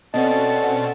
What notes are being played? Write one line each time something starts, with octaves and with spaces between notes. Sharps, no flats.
B2 C4 C#4 A4 D5 D#5 F#5 A5